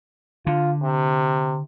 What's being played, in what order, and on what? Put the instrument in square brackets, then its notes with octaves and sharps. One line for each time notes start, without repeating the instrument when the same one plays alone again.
[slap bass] D3 [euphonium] F4
[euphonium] C3